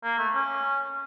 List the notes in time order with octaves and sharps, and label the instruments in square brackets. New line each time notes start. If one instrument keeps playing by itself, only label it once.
[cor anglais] A#3
A3
C#4